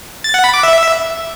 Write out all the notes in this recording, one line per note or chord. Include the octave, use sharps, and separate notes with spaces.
A6
F#5
B5
D6
E5